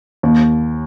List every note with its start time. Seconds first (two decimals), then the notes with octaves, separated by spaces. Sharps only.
0.23 D#2